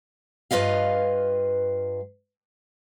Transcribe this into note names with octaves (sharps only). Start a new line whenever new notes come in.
G2 F4 B4 D#5 F5